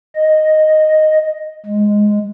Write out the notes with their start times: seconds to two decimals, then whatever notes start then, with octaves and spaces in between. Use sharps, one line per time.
0.15 D#5
1.66 G#3